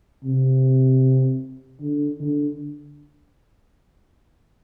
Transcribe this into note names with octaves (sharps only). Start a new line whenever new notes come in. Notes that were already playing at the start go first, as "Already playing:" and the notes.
C3
D3
D3